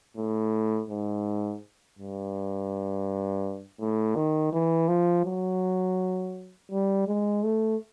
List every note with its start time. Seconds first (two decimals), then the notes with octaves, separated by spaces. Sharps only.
0.17 A2
0.90 G#2
1.99 G2
3.81 A2
4.16 D#3
4.53 E3
4.88 F3
5.25 F#3
6.71 G3
7.08 G#3
7.43 A3